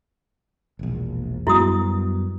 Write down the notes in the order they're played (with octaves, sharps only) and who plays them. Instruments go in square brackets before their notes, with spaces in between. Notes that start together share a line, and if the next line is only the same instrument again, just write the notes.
[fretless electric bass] E1 A#1
[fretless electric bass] F#2 G3 B3 [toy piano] E4 F#4 D#6